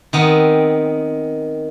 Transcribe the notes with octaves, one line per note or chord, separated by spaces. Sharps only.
D#3 B3 C4